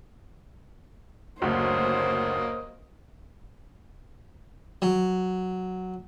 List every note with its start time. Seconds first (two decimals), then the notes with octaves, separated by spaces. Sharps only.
1.42 F#1 D2 A#3 C5 C#5 D#5
4.82 F#3